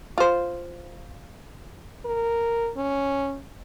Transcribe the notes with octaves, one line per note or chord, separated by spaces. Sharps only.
F4 C5
A#4
C#4